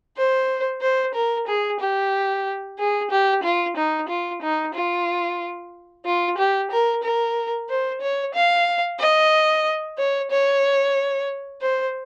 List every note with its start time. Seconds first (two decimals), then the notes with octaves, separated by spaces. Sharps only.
0.17 C5
0.81 C5
1.14 A#4
1.47 G#4
1.80 G4
2.79 G#4
3.11 G4
3.43 F4
3.77 D#4
4.09 F4
4.42 D#4
4.74 F4
6.05 F4
6.38 G4
6.71 A#4
7.03 A#4
7.69 C5
8.01 C#5
8.34 F5
8.99 D#5
9.98 C#5
10.31 C#5
11.61 C5